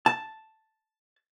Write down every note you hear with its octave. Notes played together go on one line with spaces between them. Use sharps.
A5